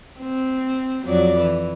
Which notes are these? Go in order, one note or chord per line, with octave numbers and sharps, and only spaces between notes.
C4
F2 F#3 D5
E3